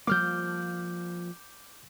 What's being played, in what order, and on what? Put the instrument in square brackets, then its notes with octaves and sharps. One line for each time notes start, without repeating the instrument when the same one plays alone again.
[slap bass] F3 G3 A#3 [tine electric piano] D6 F6 G6